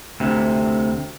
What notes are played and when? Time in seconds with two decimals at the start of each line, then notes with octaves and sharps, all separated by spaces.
0.20 D2 C3